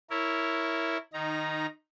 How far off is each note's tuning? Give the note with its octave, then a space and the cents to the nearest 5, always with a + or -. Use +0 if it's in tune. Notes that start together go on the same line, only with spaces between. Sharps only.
E4 -5 A#4 -15 C#5 +0
D#3 -20 D#4 +0 A#5 +10